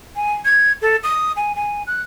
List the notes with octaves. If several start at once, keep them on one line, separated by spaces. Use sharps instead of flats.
G#5
G#6
A4
D#6
G#5
G#5
F#6